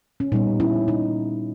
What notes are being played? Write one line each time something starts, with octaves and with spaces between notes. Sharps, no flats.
C#4
A#2 G3 B3 D#4
C#4 E4
D#4